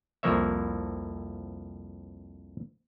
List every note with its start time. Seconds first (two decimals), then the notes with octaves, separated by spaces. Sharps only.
0.23 C2 F2 F3 A#3 C#5 E5